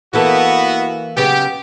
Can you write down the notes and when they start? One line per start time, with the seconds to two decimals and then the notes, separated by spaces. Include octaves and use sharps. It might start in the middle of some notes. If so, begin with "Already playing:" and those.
0.13 E3 A#3 B3 F#4 A4
1.17 C#3 F#3 B3 G4